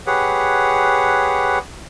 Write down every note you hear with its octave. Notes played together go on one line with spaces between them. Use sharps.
G4 G#4 B4 C#5 F#5